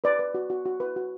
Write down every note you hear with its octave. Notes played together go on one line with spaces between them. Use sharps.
B4 D5
B4
F#4
F#4
F#4
B4
F#4